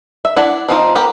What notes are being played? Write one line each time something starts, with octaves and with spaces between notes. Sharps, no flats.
E5
D4 E4 F#5
F3 C4 D4 D#4 F4
B3 G4 A#4